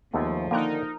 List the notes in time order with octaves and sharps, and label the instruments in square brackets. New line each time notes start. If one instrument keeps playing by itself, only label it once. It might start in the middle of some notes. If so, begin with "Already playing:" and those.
[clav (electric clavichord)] D#2 G#3 A3 [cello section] F3 [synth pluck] B3
[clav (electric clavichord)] D3 D#3 [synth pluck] A#3 G5 F#6 [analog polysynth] D#4 A#4